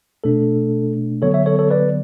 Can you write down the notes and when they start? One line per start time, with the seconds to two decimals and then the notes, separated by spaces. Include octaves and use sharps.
0.24 B2 A3 D4 A4
1.22 D3 F#3 B3 A4 C#5
1.34 C#5 E5
1.46 A4 C#5
1.59 A4 C#5
1.70 B4 D5